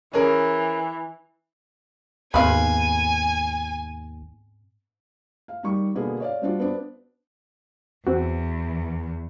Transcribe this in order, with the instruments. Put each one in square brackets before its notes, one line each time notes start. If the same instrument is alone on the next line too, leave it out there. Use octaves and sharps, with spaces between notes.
[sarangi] E3 [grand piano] C#4 G#4 A#4
[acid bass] D#2 [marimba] G#2 B3 C4 [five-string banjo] B4 F5 [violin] G#5
[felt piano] F5
D#3 G3 C#6
B2 D3 A#3 B3 G#4
C#5 D5 F5
G3 C4 D4 F4 F#4
B3 C4 D4
[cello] E2 [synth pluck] C4 F#4